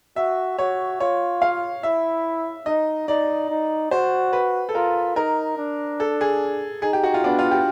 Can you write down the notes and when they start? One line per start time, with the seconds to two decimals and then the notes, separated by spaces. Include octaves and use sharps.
0.16 F#4 E5
0.58 F#4 C#5
1.00 F4 C#5
1.42 F5
1.83 E4 E5
2.66 D#4 D#5
3.08 D#4 D5
3.50 D#4
3.91 F#4 C5
4.33 B4
4.69 A4
4.75 F4 A#4
5.16 D#4 A#4
5.57 D4
6.00 A4
6.21 G#4
6.82 D#4 G#4
6.93 G4
7.03 F#4
7.14 F4
7.24 B3 D4
7.39 F4
7.51 G4